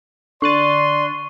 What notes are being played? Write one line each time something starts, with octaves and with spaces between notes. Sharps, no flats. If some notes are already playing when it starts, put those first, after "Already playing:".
D3 D5 C6 C#6 F#6 A6 D#7